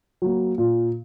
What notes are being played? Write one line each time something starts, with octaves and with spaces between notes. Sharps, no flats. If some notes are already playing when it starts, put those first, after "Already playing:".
F#3 A#3
A#2